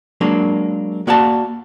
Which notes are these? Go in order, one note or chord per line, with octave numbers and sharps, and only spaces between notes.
F#3 G#3 A#3 D4
A#3 F#4 D5 F5 A5